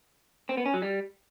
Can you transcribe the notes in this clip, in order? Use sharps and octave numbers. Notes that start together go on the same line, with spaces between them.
C4
B3
C#4
F#3
G3